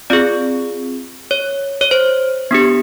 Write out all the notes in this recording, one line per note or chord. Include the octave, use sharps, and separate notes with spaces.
C4 F4 G#4 D5
C#5
C#5
C5
B3 D4 G4